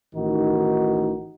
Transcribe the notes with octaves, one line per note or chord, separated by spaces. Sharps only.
A1 D#3 D#4 F#4